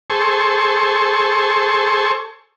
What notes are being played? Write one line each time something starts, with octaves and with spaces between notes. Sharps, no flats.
G#4 A4 C5 C#6